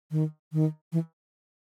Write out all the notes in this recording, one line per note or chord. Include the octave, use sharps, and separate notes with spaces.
D#3
D#3
E3